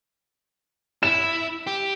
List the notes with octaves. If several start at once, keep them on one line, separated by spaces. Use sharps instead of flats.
E4 E7
G4